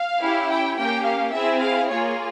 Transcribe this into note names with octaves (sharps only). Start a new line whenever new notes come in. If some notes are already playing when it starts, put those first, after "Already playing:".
Already playing: F5
C#4 E4 G4
G5
A#3 C#4 G4 G5
F5
C4 E4 G#4 E5
F5
A#3 F4 G#4 C#5